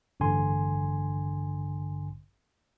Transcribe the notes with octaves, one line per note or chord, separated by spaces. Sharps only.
A1 G2 D3 G#5 C6